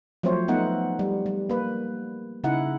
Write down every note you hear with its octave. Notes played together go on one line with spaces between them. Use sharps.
F3 F#3 A3 C4 C5 C#5
A3 B3 D#4 F#5
G3
G3
A#3 B4
C#3 D#4 E4 F#5